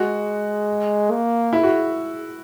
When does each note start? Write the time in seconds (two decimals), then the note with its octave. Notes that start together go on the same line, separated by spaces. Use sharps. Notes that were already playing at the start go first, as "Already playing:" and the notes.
Already playing: G#3 F#4
1.11 A#3
1.53 E4
1.63 F#4